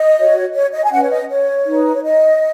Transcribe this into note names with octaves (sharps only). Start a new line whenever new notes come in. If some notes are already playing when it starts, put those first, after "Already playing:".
Already playing: D#5
F#4 C#5
C#5
D#5
G#5
C#4 B4 F#5
C#5
D#5
C#5
D#4 B4
C#5
D#5